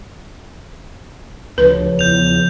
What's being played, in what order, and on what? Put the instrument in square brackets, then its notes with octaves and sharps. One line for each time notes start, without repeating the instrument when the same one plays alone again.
[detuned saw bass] D2 [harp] C#3 F3 [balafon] B4
[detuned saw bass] E2 [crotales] G6 F7